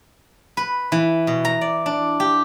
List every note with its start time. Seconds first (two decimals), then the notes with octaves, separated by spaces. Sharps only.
0.57 B4
0.92 E3
1.27 B2
1.45 A#5
1.61 D5
1.86 D4
2.20 G4